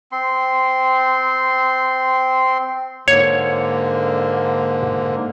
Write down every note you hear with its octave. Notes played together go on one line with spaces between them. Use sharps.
C4 C6
G#2 D3 A#3 C#5